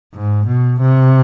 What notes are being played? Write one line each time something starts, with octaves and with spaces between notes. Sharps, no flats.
G#2
B2
C3